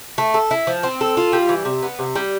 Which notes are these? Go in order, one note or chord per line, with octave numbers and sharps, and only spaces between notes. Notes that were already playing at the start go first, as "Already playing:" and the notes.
A3
A4
E4
F3
C4
A4
F4
G3
E3
C3
B3
C3
G3